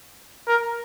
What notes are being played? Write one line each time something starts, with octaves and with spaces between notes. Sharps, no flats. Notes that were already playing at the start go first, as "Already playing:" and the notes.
A#4